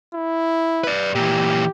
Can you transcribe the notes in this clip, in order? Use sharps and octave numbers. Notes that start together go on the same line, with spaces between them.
E4
B4 D5
A#2 E3 G4